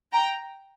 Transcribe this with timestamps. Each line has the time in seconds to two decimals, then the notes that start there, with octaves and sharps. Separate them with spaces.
0.12 G5 A#5